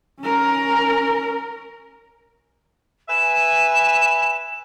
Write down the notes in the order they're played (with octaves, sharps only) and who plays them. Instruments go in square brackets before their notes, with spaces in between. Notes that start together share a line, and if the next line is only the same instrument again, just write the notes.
[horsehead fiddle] C#4 A#4
[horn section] B4 E5 G#5 [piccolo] E7